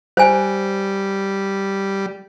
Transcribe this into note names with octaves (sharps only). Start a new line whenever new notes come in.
G3 C5 G#5